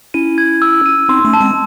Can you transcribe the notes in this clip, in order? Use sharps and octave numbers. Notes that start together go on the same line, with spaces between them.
C#4 E4 D#7
G#6
E6
D#7
C4 D#4 C6
A3 C#4
A5
G#3 C4